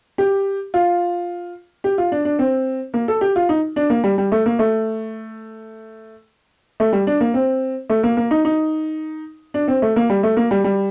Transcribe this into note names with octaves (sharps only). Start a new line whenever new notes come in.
G4
F4
G4
F4
D4
D4
C4
A#3
A4
G4
F4
D#4
D4
A#3
G3
G3
A3
A#3
A3
A3
G3
D4
A#3
C4
A3
A#3
A#3
D#4
D#4
D4
C4
A3
A#3
G3
A3
A#3
G3
G3